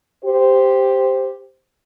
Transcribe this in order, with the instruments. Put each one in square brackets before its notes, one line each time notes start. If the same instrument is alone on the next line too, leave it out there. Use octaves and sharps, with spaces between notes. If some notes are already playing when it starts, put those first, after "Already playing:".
[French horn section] G4 C5